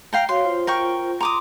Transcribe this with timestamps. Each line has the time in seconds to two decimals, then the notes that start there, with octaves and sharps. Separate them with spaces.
0.13 F5 G5 A#5
0.29 F#4 C#5 F5 C6
0.45 F4 C5
0.67 A#4 G5 C#6
1.21 A#5 C6 D6 D#6